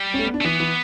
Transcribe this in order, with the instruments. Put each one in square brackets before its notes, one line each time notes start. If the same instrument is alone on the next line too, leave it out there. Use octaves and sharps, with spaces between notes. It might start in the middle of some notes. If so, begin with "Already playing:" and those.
Already playing: [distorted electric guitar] G3
[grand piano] C#4
A3
B3
D4
[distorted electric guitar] A3
[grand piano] E3 [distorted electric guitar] B3
[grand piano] E3